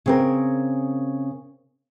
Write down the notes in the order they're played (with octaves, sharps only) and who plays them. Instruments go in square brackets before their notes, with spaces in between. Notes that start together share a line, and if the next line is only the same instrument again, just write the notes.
[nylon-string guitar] C#3 C4 A#4